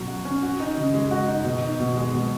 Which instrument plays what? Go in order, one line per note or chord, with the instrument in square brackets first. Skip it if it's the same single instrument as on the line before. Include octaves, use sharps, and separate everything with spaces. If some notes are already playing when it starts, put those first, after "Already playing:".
Already playing: [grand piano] B2 F#3 C#4
F#4
C#4
F#4
D#4
C#3
G#3
F#4
D#4
B2
D#4
B2
G#3
B2